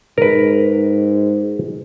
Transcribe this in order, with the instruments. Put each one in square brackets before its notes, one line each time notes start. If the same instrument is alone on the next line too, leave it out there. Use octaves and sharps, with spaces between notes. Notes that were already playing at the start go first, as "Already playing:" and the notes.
[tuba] G#2 [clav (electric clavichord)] A#4 B4